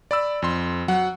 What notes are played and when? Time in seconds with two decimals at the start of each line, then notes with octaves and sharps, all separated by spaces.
0.11 D5 B5 E6
0.42 F2 C6
0.88 F#3 F#5